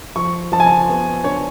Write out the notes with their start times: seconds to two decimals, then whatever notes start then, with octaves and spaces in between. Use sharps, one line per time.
0.16 F3 C#6
0.52 F3 A5
0.60 G#5
0.66 A5
0.89 B3
1.24 D4 C#5